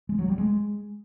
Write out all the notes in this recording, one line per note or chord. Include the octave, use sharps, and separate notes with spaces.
G#3
F#3
G3
G#3